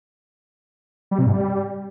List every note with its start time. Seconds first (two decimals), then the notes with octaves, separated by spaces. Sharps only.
1.11 G3
1.19 C3
1.26 G#2
1.33 G3